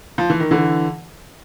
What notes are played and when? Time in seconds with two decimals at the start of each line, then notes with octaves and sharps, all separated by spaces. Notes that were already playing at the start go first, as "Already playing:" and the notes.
0.18 F3
0.30 E3
0.40 D#3
0.51 D3 E3